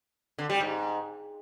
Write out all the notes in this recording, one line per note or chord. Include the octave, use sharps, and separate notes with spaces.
D3
G3
G#2